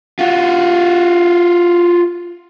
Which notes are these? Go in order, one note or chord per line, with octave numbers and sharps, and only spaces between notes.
F4 F#4